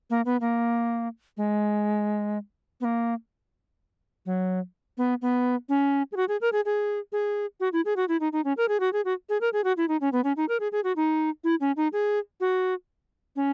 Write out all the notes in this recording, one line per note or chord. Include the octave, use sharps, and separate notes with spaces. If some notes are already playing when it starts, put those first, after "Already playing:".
A#3
B3
A#3
G#3
B3
A#3
F#3
B3
B3
C#4
G#4
F#4
G#4
A#4
G#4
G#4
G#4
F#4
E4
G#4
F#4
E4
D#4
D#4
C#4
A#4
G#4
F#4
G#4
F#4
G#4
A#4
G#4
F#4
E4
D#4
C#4
B3
C#4
D#4
A#4
G#4
G#4
F#4
D#4
E4
C#4
D#4
G#4
F#4
C#4